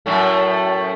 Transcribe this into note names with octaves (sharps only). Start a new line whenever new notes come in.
F#2 A2 A3